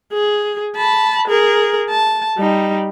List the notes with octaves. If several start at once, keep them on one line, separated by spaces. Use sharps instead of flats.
G#4
A5 B5
G#4 A#4
A5
G3 D#4